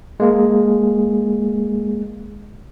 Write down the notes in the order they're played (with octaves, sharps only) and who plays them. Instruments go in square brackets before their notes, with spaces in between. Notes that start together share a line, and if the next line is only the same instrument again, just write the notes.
[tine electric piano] G#3 A#3